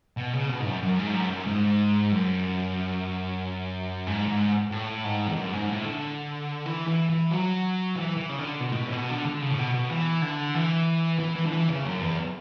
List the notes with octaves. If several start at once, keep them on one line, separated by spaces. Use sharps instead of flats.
B2
C#3
B2
G#2
F#2
F#2
G#2
F#2
F#2
G#2
F#2
G#2
G#2
A2
G#2
E2
F#2
G#2
A2
D3
E3
E3
E3
F#3
E3
E3
C#3
D3
B2
A2
B2
A2
B2
D3
D3
C#3
A2
B2
B2
E3
D3
E3
E3
E3
D3
E3
C#3
F#2
E2